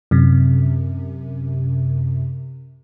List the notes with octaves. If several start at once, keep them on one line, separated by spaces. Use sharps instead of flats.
F#2 C3